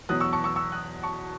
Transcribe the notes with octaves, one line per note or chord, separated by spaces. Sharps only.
E2 B2 F#3 D#6 F#6
C#6 E6
A5 C#6
C#6 E6
C#6 E6
D#6 F#6
A5 C#6